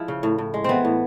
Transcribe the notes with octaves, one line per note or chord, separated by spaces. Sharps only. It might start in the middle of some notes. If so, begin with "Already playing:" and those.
Already playing: F3 G#3 E4
C#3
A2
A2
G#3
E3 B3 C4
A2